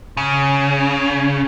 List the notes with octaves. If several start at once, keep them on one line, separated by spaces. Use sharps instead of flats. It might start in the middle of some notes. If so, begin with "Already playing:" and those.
C#3